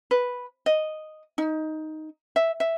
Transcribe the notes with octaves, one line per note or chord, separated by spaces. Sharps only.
B4
D#5
D#4
E5
E5